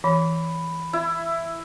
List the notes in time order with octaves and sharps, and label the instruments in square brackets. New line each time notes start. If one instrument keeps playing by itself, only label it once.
[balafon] E3 [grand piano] B5
[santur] E4